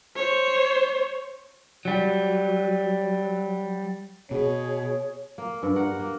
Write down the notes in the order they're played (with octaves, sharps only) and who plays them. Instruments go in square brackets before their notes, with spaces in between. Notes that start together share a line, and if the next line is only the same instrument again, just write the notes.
[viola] C5 C#5
[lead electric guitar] F#3 G3
[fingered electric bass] B2 [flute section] G#4 C#5
[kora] A#3
G2
A#4 F#5
A#3